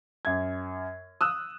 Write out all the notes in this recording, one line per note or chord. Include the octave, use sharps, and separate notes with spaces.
F#2 G#6
D#6 E6 F#6